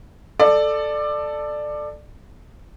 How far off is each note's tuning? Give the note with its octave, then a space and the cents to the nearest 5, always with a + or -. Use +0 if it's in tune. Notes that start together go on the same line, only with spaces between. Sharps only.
A4 +0 D5 +20